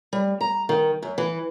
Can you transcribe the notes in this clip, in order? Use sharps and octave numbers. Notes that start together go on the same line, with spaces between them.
G3
A#5
D#3
F#2
E3